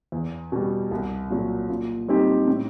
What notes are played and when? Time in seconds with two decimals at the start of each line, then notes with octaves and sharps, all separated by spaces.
0.12 E2
0.52 B2 G3
0.91 C2
1.30 A#2 F#3
1.69 A#2
2.08 G3 C4 D#4 G4
2.47 A2